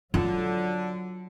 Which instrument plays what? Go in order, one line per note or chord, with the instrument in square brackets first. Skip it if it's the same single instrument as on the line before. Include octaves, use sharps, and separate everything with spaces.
[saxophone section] D3 [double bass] F#3 [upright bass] F4